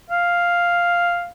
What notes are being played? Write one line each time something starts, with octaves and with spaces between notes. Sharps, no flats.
F5